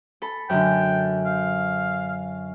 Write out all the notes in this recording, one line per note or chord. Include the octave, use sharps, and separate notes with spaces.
A4 B5
F#2 D3 G5
F5